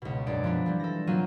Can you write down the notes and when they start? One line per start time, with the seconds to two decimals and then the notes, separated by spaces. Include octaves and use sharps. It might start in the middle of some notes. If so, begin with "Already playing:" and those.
0.02 C#2 B2
0.26 F#2 G#3 D4 D5
0.44 F3 B3 D4
0.66 E3 G3
0.80 A4 A#6
1.07 F#3 A#3 C4 F4 D#7